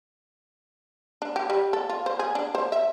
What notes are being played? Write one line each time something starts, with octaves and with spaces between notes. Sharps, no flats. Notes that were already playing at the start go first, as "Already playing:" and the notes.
D4
G4
G3
A4
F4
C5
G#4
D4
C5
E5